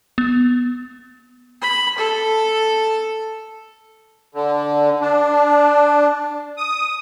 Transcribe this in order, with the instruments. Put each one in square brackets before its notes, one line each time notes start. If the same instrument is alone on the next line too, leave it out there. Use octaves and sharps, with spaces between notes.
[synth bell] B3
[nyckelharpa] B5
A4
[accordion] D3
D4
D#6